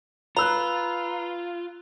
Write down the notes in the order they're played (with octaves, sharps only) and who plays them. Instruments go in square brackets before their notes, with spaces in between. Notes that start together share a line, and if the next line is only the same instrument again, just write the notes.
[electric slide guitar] F4 [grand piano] B4 E6 F#6 [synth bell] A#5 F7